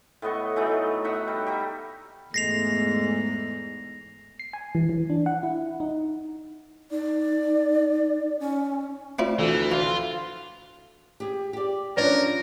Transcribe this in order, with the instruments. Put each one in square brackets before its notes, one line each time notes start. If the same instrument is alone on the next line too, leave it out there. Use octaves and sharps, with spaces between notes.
[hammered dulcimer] A2 B3 D#5 C#6
E3 F#3 A3 D#4
D#4 E5 F#5
G3
G4 E5 A#5
[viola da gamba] E2 G#2 [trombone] G#3 [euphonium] A3 [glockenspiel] A#6 C7 F7
[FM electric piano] C7
G#5
E3
E3
D4
F#5
E4
D#4
[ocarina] D#4 [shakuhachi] D5
[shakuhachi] C#4
[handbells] A3 C5 D5 [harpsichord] C4 E4 F4
[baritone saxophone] D2 [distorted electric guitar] E3
[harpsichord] E3 [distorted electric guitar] F4
[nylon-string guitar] G4 G#4
G4 D5
[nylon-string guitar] F3 C#4 D4 [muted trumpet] A#4 [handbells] B4 C#5 D5